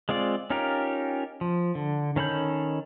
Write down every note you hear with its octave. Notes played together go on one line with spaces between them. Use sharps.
G#3 C4 F4 D5
C#4 D#4 F4 G4 A#4
F3
D3
D#3 C#4 A4 B5 G6